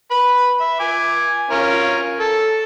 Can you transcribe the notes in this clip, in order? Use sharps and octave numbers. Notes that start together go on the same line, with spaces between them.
B4 B5
E5
G#5 D6
C#4 F4 A#4
A4